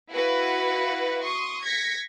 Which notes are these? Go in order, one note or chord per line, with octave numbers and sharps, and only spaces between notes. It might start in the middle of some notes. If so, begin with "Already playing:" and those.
E4 F#4 B4 F5 F#5
C6 C#6 D#6
G#6 A#6 B6 C#7